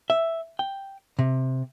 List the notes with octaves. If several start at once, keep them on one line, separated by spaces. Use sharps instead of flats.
E5
G5
C3